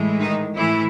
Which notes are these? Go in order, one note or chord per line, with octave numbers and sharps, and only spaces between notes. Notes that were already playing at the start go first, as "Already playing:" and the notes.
Already playing: A2 E3 G#3
D#3 D#4
A2 E3 E4